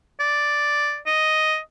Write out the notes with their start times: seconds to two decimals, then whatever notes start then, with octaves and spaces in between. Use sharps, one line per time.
0.20 D5
1.06 D#5